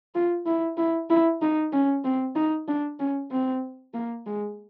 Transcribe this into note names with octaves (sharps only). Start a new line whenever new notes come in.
F4
E4
E4
E4
D#4
C#4
C4
D#4
D4
C#4
C4
A#3
G#3